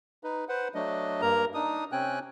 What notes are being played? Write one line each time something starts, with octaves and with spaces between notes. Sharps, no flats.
D#4 B4
B4 C5 F#5
F#3 A3 D4 D#5
G2 A#3 A#4 A#5
D4 D#4 D#6
C3 C4 C#4 G5 G#5 F#6